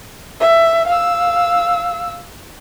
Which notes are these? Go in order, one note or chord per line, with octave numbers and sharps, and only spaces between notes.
E5
F5 E6